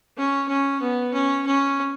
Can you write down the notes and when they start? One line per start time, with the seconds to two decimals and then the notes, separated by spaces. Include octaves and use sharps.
0.17 C#4
0.49 C#4
0.81 B3
1.13 C#4
1.47 C#4